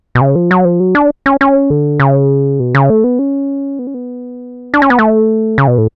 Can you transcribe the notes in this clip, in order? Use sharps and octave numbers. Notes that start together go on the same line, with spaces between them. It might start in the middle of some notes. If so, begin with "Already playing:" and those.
B2
C#3
F3
F#3
F3
F#3
D4
C#4
C#4
D3
C#3
B2
C#3
A3
B3
C#4
B3
C#4
B3
D4
C#4
B3
A3
C#3
B2
A2